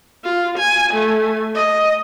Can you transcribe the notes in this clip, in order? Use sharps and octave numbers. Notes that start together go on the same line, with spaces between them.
F4
G#5
A3
D#5